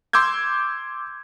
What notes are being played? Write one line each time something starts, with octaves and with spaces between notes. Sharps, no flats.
C6 D6 E6 G6 G#6